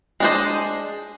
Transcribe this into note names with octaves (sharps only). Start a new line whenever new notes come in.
G#3 D4 G#4 C5 D#5